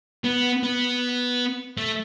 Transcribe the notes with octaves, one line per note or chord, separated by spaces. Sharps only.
B3
B3
A3